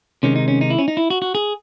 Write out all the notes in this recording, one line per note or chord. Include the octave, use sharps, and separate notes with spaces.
C3 D#3 G#3 C#4
D#4
C#4
D#4
E4
C#4
D#4
E4
F#4
F#4
G#4